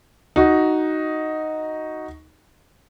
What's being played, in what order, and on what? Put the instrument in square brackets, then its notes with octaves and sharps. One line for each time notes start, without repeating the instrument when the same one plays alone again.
[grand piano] D#4 F#4